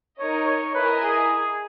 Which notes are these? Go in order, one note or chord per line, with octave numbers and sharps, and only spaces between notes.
D#4 A#4 C#5 D#5
C#5
E4 A#4 B4 D#5 G#5
G#4